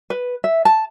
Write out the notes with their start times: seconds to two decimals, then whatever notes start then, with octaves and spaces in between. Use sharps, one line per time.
0.10 B4
0.44 E5
0.65 A5